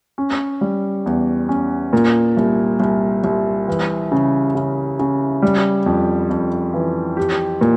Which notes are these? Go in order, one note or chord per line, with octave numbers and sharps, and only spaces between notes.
C#4
G3
E2
C#4
A#2
C2
C2
C2
E3
C#3
C#3
C#3
G3
F2
F2
E3
G4
A#2